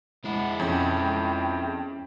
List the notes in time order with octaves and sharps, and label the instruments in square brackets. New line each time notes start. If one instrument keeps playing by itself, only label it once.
[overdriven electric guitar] G#3 E4 [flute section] F#5
[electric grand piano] F2 [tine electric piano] C#4 C#5 [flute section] G5